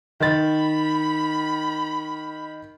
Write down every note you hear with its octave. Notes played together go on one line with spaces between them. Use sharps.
D#3 B5 C6 A6